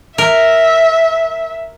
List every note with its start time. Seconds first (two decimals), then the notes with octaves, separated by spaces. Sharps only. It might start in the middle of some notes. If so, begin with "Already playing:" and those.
0.18 A#4 E5